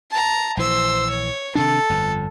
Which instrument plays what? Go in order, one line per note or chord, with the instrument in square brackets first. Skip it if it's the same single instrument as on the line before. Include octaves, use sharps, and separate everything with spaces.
[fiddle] A5 A#5
[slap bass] A#1 E3 [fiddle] C5 E6
[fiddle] C#5
[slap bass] C3 D#3 D4 [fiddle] A4
[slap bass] G1 F2